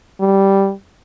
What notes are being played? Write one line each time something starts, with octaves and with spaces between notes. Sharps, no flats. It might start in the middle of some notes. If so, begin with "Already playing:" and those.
G3